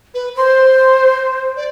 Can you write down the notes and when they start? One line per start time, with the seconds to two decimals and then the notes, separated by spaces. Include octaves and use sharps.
0.14 B4
0.37 C5 C6
1.57 D5